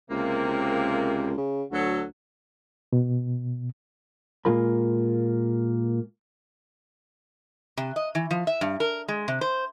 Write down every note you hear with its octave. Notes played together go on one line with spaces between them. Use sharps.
C#2 C3 A#3
C#2
C#3
D2 F#3 F#4 A4
B2
A#2 G#3 A#3 F4 A#4 B5
C3
D#5
E3
F3
E5
G2
A#4
G#3
C3
C5